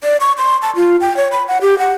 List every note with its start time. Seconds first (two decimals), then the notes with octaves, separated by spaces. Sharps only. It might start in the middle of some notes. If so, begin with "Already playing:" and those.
0.04 D5
0.21 C#6
0.38 C6
0.62 A5
0.76 F4
1.01 G5
1.17 C#5
1.32 B5
1.48 F#5
1.62 G4
1.79 F#5